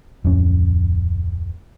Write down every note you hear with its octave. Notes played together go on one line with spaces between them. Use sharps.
D1 F2 C#4